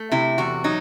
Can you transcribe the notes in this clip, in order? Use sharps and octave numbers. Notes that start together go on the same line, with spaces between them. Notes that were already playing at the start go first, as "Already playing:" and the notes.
Already playing: A3
C3 E4
E2 F#4
F#3 D#4